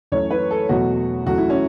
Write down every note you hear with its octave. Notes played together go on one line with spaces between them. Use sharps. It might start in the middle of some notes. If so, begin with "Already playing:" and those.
F#2 E3 A3 C#5
B4
A4
E2 B2 F#3 A3 F#4
F#2 E3 A3 F#4
E4
C#4